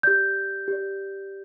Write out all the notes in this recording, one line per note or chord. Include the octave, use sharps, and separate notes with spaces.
G4 D5 G6
G4 D5